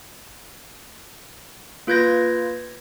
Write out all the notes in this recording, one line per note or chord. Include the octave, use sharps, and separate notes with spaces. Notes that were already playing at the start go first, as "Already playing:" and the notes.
A#3 F4 B4 G6 G#6 A#6